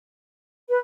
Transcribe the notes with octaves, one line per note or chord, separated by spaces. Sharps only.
B4